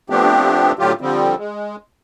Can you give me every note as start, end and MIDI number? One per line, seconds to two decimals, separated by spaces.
0.10 0.72 53
0.10 0.72 57
0.10 0.72 59
0.10 0.72 60
0.10 0.72 62
0.10 0.72 67
0.79 0.93 45
0.79 0.93 50
0.79 0.93 54
0.79 0.93 65
0.79 0.93 67
1.01 1.35 50
1.01 1.35 53
1.01 1.35 55
1.01 1.35 60
1.37 1.76 56